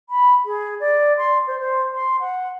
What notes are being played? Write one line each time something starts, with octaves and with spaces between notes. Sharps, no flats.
B5
G#4
D5
C6
C5
C5
C6
F#5